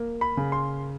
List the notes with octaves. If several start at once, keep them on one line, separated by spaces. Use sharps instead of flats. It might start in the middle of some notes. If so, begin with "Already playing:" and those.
Already playing: A#3
B5
C#3
C6